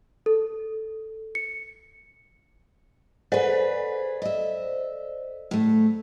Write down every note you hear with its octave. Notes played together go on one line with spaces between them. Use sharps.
A4
C#7
G#4 A4 B4 C5 D5
D#5 E5
A2 A3